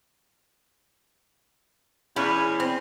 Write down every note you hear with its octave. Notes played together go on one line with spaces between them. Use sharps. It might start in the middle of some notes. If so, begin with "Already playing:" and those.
E2 C#4 E4 B4
C4